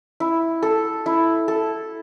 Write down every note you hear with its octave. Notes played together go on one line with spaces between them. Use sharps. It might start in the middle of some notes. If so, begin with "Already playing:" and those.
E4
A4
E4
A4